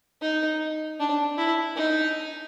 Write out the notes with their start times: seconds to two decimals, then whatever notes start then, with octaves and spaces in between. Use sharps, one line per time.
0.22 D#4
1.00 D4
1.38 E4
1.76 D#4